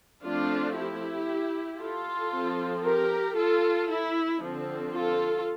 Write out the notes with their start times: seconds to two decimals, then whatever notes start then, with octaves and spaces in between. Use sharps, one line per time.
0.24 F3 A3 C4 D4 F4
0.76 E4 G4
1.80 F4 A4
2.32 F3 C4
2.85 G4 A#4
3.37 F4 A4
3.89 E4
4.41 D3 F3 C4
4.93 F4 A4